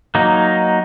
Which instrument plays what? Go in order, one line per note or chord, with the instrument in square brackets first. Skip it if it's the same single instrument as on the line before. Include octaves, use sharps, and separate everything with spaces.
[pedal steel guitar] F#3 A#3 D#4